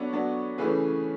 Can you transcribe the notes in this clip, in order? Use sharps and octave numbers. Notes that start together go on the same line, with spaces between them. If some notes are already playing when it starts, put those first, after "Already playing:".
Already playing: F#3 B3 D4 A4 C#5
F#3 B3 D4
C#3 E3 A3 C#4 G#4 B4